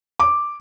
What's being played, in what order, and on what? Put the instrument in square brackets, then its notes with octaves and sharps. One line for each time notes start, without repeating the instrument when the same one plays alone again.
[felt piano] D6